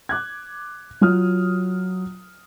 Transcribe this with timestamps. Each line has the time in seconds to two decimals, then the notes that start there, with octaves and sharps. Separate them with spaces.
0.09 D6 F#6 G#6
1.01 F#3 F4 D#6 F6